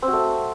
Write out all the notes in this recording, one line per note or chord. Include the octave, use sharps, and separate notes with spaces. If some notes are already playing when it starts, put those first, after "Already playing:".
C4
F#4
A3